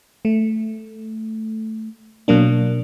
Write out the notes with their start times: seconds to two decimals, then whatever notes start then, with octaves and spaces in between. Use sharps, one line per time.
0.25 A3
2.28 B2 F#3 A#3 D4